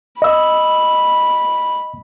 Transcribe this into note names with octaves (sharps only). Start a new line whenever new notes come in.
D#5 B5 E6